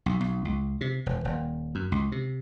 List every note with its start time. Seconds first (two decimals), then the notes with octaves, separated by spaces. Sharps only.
0.06 B1
0.20 B1
0.45 C#2
0.81 C3
1.06 E1
1.25 D#1
1.75 F#2
1.92 C#2
2.12 C3